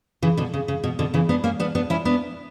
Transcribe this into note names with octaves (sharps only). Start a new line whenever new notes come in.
C#3 E3
B2 D3
C#3
C#3
B2
B2 D3
C#3 E3
B3 D4
A#3 C#4
B3 D4
B3 D4
C#4 E4
B3 D4